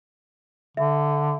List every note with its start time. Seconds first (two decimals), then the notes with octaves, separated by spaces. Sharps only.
0.77 D3 E5